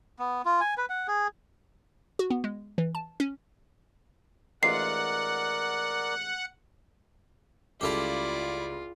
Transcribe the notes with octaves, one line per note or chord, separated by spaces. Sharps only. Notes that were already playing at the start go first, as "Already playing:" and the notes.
B3
F4
G#5
B4
F#5
G#4
F#4
B3
G#3
E3
A5
C#4
A1 G#2 F4 A#4 D5 F#5 C7
C#2 G3 E4 F4 G4 A4 D5 F5